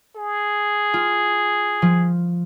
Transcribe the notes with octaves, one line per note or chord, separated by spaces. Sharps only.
G#4
F4
F3